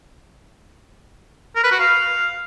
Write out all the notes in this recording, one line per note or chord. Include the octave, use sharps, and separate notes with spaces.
A#4
B4
F#4
F5